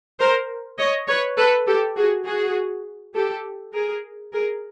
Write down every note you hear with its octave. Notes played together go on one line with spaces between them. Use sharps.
A#4 C5
C#5 D#5
B4 C#5
A4 B4
G4 A4
F#4 G#4
F#4 G#4
G4 A4
G#4 A#4
G#4 A#4